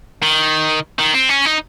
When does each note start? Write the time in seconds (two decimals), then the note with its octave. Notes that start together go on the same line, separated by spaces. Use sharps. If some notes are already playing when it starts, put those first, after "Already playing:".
0.23 D#3
0.99 D#3
1.14 C4
1.29 C#4
1.45 D#4